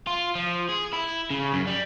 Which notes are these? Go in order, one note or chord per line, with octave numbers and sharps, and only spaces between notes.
F4
F3
G#4
E4
C#3
F#2
G3